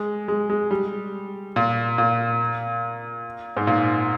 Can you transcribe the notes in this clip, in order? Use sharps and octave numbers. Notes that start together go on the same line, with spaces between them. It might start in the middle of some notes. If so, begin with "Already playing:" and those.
Already playing: G#3
G#3
G#3
G3
A#2
A#2
G#2
A#2